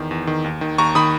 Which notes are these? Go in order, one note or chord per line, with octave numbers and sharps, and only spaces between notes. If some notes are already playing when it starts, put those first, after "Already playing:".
Already playing: E2 D#3
E2
D#3
D#2
D#3
D#2 A#5 C#6
D#3 B5 D#6